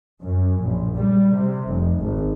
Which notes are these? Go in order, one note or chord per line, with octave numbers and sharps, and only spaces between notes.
F#2
A#1
G3
C3
F1
G#1